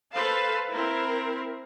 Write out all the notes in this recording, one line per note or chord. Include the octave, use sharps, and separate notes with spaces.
A4 B4 C5 F5 A5
C4 E4 A#4